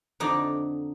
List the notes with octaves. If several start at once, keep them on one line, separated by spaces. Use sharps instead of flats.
F2 D3 D#4 D5